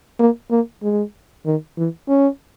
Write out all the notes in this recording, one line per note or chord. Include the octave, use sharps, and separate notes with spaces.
A#3
A#3
G#3
D#3
E3
C#4